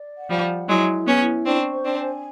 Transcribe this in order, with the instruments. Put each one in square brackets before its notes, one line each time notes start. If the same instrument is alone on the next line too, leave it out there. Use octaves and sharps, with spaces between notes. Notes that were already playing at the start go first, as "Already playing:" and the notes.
Already playing: [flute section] D5
F#5
[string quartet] F3 G3
[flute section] F#5
[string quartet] F#3 G#3 [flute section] E4
[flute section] G#4
[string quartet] B3 C#4
[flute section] E4
[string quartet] C4 D4 [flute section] C#6
[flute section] C5
[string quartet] C4 D4
[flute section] G#5